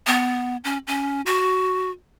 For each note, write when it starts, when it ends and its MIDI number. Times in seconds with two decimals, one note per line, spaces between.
0.07 0.57 59
0.64 0.78 61
0.87 1.21 61
1.26 1.91 66